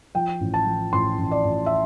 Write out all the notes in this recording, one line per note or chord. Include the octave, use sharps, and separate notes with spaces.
F3 G5
A1
A5
F3
A1 C6
A1
D5
A1
E5